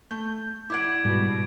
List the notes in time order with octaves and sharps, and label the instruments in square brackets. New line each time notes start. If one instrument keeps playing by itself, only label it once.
[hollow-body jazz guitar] A3 [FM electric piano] G6
[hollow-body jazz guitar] E4 D5 F#5 [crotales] D6 G#6 D7
[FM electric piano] G#2 G3 [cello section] B2